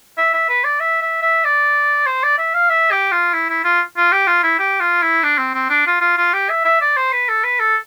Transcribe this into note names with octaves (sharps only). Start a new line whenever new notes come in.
E5
E5
B4
D5
E5
E5
E5
D5
C5
D5
E5
F5
E5
G4
F4
E4
E4
F4
F4
G4
F4
E4
G4
F4
E4
D4
C4
C4
D4
F4
F4
F4
G4
E5
E5
D5
C5
B4
A4
B4
A4